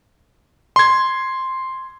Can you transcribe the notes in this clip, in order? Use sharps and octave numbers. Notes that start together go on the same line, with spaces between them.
C6 G#6